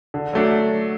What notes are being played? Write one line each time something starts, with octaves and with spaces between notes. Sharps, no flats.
D3
F#3 A3 D4